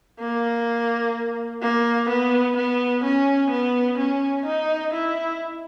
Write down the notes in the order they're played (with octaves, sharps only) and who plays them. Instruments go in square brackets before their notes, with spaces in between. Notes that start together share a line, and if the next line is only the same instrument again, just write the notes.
[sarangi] A#3
A#3
B3
B3
C#4
B3
C#4
D#4
E4